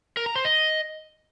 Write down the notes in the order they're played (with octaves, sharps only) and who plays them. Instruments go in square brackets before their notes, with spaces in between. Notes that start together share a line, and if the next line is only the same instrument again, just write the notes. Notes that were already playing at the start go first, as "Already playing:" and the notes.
[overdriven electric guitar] A#4
A#5
C5
D#5